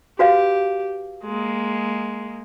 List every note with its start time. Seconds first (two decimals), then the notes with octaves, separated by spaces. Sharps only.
0.19 F#4 G4 B4 F5
1.24 G#3 A#3